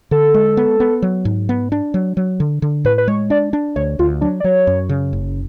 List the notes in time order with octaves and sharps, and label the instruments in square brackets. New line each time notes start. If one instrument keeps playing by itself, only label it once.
[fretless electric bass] D3 [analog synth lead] A4
[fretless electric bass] G#3
B3
B3
F#3
G#2
B3
D4
F#3
F#3
D3
D3
[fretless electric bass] A2 [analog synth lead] B4
[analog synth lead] B4
[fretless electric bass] G#3 [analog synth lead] C#5
[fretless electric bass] D4 [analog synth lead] D5
[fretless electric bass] D4
[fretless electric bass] D2 [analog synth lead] C#5
[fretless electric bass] D2 [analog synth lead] F4
[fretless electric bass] F#3 [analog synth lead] D4
[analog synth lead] D5
[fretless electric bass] F#3 [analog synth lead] C#5
[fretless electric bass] F#2
C#3
F#1